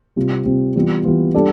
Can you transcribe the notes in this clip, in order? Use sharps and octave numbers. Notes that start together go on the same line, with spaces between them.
C3 G3 C4 F4
C3 G3 C4 F4
E3 G3 B3 F4
E3 G3 B3 F4
G3 D4 A4 D5